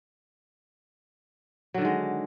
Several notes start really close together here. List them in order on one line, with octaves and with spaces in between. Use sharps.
F#3 D3 D#3 G#3